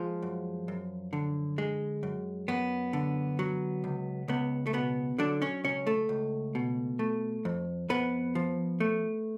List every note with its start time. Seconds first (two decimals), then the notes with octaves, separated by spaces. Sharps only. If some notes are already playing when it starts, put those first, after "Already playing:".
Already playing: F3 G#3 F4
0.22 F#2
0.68 F#2
1.13 D3
1.58 G#3
2.03 F#2
2.48 F#2 B3
2.93 D3
3.39 F#3
3.84 C#2
4.28 C#2 B3
4.67 A3
4.73 B2 B3
5.18 D3 F#3 D4
5.42 C#4 C#5
5.64 C#2 C#4 C#5
5.87 A3 A4
6.09 C#2
6.55 B2
6.99 A3
7.45 F2
7.89 F2 B3 B4
8.35 F3
8.80 A3